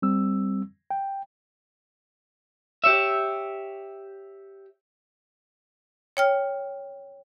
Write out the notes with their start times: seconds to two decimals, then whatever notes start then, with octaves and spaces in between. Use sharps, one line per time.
0.02 G3 C4 E6
0.90 G5
2.84 G4 C#5 E5
6.17 C#5 G5 F6